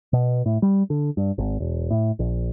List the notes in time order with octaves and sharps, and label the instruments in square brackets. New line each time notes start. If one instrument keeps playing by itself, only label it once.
[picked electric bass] B2
A2
G3
D3
G2
G#1
E1
A2
A#1